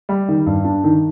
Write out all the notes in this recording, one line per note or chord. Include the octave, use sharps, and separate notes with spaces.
G3
D#3
G2
D4
D#3